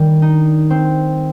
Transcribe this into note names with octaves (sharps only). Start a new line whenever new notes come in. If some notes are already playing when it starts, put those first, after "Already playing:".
Already playing: D#3 G3
D#4
C4